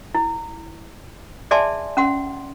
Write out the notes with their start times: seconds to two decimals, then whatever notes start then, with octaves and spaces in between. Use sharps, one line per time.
0.15 E4
1.51 G#4 D5 E5 G#5 A5 C6
1.97 C#4 F#5 C6